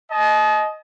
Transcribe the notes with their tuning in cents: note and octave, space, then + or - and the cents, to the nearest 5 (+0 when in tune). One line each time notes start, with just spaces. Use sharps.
D#5 +5 A5 -45